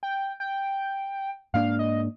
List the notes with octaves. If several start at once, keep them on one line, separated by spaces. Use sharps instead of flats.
G5
G5
G#2 A#3 D4 F5
D#5